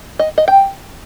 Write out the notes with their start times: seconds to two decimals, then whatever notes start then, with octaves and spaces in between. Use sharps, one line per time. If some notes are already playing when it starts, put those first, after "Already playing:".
0.19 D#5
0.38 D#5
0.48 G5